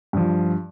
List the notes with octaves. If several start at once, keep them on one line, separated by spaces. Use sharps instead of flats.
G2 F3